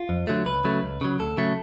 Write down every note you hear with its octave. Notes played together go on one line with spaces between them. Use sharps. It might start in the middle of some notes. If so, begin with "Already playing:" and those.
Already playing: F4
F2
D3 F#3 A3
C#2 B4
C#3 F#3 A3
C#2
C#3 F#3
D2 A4
C#3 F#3 A3